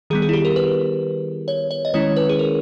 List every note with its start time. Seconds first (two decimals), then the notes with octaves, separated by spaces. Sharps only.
0.10 D#3 G3 B3 G#4
0.22 G#4
0.29 E4
0.33 G4
0.45 A#4
0.56 B4
1.48 C#5
1.71 C#5
1.85 D#5
1.94 D#3 G#3 C#4 E4 C#5
2.16 B4
2.29 G#4
2.39 A#4